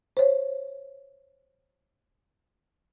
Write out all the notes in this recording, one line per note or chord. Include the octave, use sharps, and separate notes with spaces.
C5 C#5